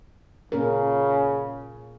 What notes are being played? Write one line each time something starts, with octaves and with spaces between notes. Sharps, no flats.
A#2 C#3 C#4 A#4